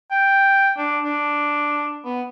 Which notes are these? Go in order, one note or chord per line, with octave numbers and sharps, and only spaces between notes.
G5
D4
D4
B3